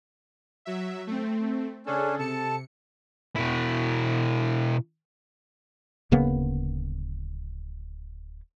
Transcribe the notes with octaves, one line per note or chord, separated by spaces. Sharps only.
F#3 E5
A3 C4
C#3 C#4 D4 G#4 A4
C3 A4 A5 C#7
B2 E4
D1 C#3 A#3 B3